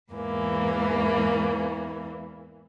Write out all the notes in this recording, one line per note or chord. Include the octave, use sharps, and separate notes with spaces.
E2 G#2 E3 A#3